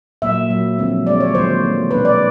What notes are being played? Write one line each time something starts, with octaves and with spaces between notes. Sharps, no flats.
A#2 F#3 A#3 E5
A#2 F#3 A#3
D3 F3 G#3 C4
D3 F3 G#3 C4 D5
C#5
D#3 F#3 A#3 C5
D#3 F#3 A#3
B2 G#3 B3 D4 B4
D5